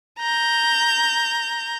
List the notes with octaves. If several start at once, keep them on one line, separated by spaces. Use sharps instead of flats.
A#5 G6